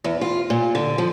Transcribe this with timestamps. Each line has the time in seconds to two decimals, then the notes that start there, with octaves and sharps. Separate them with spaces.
0.04 E2
0.21 F4
0.50 A#2
0.75 D3
0.98 F3